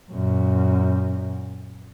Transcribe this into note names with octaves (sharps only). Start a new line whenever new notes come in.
F#2 A#2